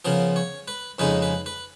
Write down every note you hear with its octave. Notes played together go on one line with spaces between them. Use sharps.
C#3 F3 B3 A#4
C#5
B4
F2 C#3 G#3 D#4 B4
B4
B4